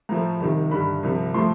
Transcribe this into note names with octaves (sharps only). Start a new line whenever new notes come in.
A2 F3 A3 A#5
C2 C3 D#3
G2 D3 G3 B5
C2 C3 F3
A2 F3 A3 C6